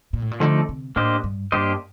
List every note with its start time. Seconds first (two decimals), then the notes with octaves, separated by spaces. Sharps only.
0.13 A#2
0.22 A2
0.31 A#2
0.40 D3 F3 A3 D#4 A4 D5
0.69 C3
0.96 A2 A#3 D4 G4 C5 D#5
1.24 G2
1.52 G2 A#3 D4 G4 C5 D#5